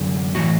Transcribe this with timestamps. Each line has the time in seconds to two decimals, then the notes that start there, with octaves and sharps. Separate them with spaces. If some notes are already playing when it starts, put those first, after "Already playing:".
Already playing: F#2 D3
0.35 A2 E3 F#4